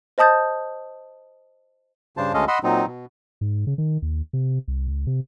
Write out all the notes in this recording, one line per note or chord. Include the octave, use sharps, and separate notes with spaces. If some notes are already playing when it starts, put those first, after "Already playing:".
C5 D#5 A5 D#6 G6 A6
G2 C#3 D4 C5 A5
D2 G#3 C#4 A4 D#5 F5
D#5 F#5 B5 C6 E6
A#2 F#3 C4 D#4
B2
G#2
C#3
D#3
D#2
C3
C2
C#2
C3